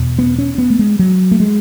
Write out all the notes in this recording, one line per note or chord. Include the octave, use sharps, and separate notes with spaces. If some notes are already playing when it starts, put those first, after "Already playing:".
Already playing: E2 B2
B3
C#4
B3
A3
G#3
F#3
A3
G#3